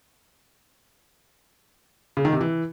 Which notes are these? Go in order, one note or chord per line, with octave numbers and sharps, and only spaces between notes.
C#3
D#3
C3
E3